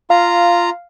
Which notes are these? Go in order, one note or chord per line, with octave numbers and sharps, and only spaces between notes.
F4 F5 A#5